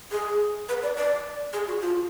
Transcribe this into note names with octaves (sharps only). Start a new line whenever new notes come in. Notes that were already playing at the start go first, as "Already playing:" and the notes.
G#4
B4
D5
D5
G#4
F#4
F4